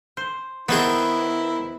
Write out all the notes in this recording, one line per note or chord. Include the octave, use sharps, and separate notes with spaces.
C5
D#3 B3 C4 E4 G#4